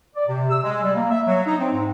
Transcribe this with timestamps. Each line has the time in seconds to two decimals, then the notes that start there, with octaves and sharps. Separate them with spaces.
0.15 D5
0.27 C3
0.50 E6
0.63 G#3
0.82 G3
0.95 A#3
1.10 E5
1.26 F#3
1.46 D#4
1.58 C4
1.72 G#2